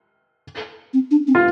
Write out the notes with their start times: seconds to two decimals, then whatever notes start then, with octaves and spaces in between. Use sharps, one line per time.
0.93 C4
1.11 D4
1.27 C4
1.35 F4